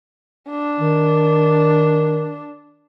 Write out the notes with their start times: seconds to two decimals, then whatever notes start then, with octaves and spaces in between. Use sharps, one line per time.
0.50 D4
0.80 D#3